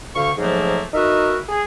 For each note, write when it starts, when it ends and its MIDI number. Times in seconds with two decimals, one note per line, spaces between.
0.15 0.30 38
0.15 0.30 50
0.15 0.30 77
0.15 0.30 85
0.38 0.81 44
0.38 0.81 53
0.38 0.81 54
0.38 0.81 57
0.38 0.81 58
0.94 1.37 63
0.94 1.37 66
0.94 1.37 70
0.94 1.37 71
0.94 1.37 76
1.49 1.61 68